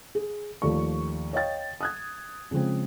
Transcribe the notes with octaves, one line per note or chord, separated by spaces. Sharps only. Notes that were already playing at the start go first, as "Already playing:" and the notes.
G#4
D#2 F3 A3 A4 D5 C#6
C#5 D#5 F5 G5 A6
D#6 F#6 G#6
C#3 F3 G#3 C4